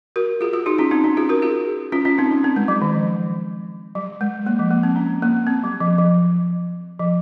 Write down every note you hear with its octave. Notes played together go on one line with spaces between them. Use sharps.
F#4 A#4
F4 G#4
F4 G#4
D#4 F#4
C#4 F4
C4 D#4
C#4
F4 G#4
F#4 A#4
F4 G#4
C#4 F4
C#4 F4
C4 D#4
C#4
C4
G#3
F#3
D#3
F3
F#3
G#3
A#3
F3
A#3
C4
C#4
A#3
C4
F#3
F3
F3
F3